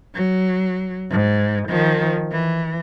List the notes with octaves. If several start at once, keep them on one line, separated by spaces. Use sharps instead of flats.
F#3
G#2
D#3 F3
E3